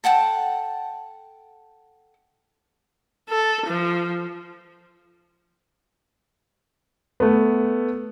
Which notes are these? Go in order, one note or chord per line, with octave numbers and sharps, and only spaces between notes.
A4 F#5 G5 A5
A4
F3
A3 B3